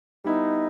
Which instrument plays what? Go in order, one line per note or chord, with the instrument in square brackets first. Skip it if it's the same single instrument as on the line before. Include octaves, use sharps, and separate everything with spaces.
[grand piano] G3 B3 E4 [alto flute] D#4